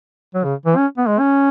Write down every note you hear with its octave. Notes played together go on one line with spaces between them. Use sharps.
F#3
C#3
E3
C#4
B3
G#3
C#4